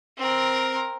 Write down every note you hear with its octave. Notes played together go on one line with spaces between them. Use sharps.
C4 A#4